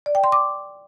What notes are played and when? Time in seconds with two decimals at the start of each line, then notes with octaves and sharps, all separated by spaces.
0.06 D5
0.15 G5
0.24 C6
0.32 D6